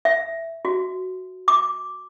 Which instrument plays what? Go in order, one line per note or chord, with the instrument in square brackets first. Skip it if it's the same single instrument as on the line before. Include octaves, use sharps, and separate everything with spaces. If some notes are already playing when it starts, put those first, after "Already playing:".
[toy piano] E5
F#4
D6